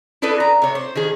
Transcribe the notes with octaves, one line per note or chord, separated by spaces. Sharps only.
E4 G#4 A4 B4 D5
A#5
C3 C#5
C5
D#3 G#4